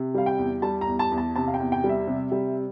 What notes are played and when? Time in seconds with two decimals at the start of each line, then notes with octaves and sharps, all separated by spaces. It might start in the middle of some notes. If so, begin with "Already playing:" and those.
Already playing: C3
0.14 G3 F5
0.26 G5
0.38 E2
0.62 G3 A5
0.81 A#5
0.87 E2
0.99 A5
1.11 E2
1.18 A5
1.36 C3 A5
1.47 F5
1.54 G5
1.60 E2
1.72 G5
1.84 G3
1.89 E5
2.07 C3
2.32 G3